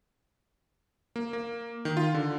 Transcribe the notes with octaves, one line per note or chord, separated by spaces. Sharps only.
A#3
A#3
D#3
F4
D3